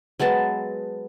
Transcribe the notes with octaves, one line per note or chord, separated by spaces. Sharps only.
F#3 G#3 B3 A5